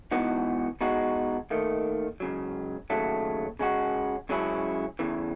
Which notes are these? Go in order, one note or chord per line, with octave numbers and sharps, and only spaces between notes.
G#2 E3 B3 D#4 F#4
B2 G#3 D#4 F#4
D#2 D#3 A3
C#2 C#3 F#3
D#2 C#3 F#3 A3
C#3 G#3 C#4 F#4
C#2 C#3 F#3 C#4 E4
E2 C#3 E3